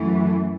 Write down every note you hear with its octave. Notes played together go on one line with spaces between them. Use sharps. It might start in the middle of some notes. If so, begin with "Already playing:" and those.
Already playing: F#2 E3 A3